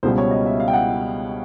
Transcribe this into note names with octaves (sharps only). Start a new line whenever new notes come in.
C#2 B2 G3 C5
C#5
D#5
E5
F5
G5
F#5